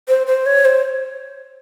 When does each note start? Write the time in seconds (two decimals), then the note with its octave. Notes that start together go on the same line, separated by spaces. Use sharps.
0.08 C5
0.27 C5
0.46 C#5
0.65 C5